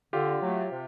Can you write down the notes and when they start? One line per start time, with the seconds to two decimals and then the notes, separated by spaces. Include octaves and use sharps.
0.13 D3 F4 G4
0.42 F#3 A3
0.71 C3